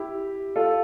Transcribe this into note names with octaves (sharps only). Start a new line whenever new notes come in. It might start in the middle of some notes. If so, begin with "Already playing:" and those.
Already playing: E4 G4
F4 A4